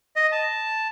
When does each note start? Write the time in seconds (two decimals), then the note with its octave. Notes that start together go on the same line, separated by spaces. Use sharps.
0.16 D#5
0.32 A5